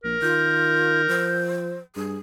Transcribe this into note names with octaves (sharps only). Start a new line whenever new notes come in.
A#1 A#4
D#3 F4 G6
F3 C5
G2 G#4